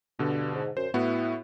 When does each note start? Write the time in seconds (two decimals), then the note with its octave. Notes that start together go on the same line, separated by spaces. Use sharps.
0.19 G2 B2 D3
0.54 G#2
0.77 F#2 C5
0.94 A2 B3 E4 F#4